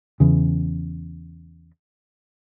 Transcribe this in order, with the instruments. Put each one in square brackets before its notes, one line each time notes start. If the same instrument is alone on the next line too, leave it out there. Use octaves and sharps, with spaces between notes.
[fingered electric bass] E2 C#3